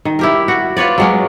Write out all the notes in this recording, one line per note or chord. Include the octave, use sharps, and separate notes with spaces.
D#3
E4 G4 A#4
F#4
F4 B4 C#5 D5
F#3 G#3 C#4